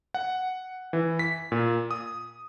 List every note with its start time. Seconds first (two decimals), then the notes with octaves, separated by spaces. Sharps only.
0.14 F#5
0.93 E3
1.19 B6
1.52 A#2
1.91 D#6